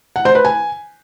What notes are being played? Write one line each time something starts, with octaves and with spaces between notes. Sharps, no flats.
F#5
C5
B4
G#5